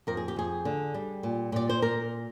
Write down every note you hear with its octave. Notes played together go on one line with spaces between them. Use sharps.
F2 A#4
G#4
G4
F2 G#4
D3
G3
A#2
A#2 D5
C5
A#4